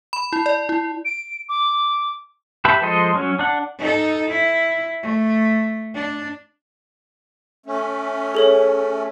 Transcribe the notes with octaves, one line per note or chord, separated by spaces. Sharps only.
B5
E4
D5
E4
D7
D6
G4 B4 E5 A5 B5
F3 G#3 A4 C5 D#5
F#3 C#4
D4 F#5
D#4 A4
E4
A3
D4
A3 C#4
G#4 A4 C#5